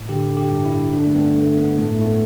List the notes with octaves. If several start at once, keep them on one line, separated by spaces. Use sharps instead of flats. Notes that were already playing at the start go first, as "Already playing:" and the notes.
Already playing: A2
D3 G4
D3
G4
G2
E4
G2
D3 D4
A3
G2 B3
D3 A3
G2 B3
A2 A3
A2 A3
B3